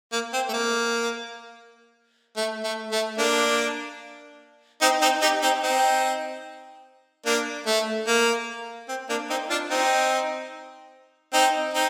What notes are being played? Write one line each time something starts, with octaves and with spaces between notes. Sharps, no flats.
A#3
C4
A3
A#3
A3
A3
A3
A#3 D4
C4 D#4
C4 D#4
D#4 G4
C4 D#4
C4 D#4
A#3 D4
A3
A#3
C4
A#3 D4
C4 D#4
D4 F4
C4 D#4
C4 D#4
C4 D#4